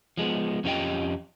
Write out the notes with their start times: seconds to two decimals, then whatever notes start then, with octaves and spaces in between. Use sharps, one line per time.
0.17 F3 G#3 A3 B3
0.64 F2 C#4 F4 G4 D#5 G5